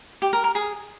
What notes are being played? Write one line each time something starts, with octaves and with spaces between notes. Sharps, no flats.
G4
A#4
A#4
G#4